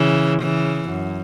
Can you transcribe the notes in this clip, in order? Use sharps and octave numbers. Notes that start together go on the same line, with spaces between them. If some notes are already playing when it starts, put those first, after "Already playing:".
Already playing: C#3 E3
C#3 E3
F#2